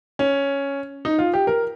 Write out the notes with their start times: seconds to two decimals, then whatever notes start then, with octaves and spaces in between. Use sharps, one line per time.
0.19 C#4
1.05 D#4
1.18 F4
1.34 G4
1.47 A#4